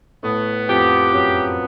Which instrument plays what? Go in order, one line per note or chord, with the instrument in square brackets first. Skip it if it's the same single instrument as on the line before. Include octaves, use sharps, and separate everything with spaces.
[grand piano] A2 A3 [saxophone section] B3
[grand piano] F2 F3 [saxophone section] G4
[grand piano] F#2 F#3 [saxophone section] B3